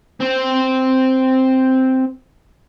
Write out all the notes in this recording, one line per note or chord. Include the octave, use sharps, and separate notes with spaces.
C4 C5